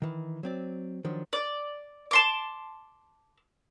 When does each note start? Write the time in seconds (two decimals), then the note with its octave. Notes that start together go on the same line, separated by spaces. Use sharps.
0.02 D#3 E3
0.43 F#3 C4 D5
1.04 D#3 F3 F#3 D4
1.33 D5
2.11 A5 C6 D6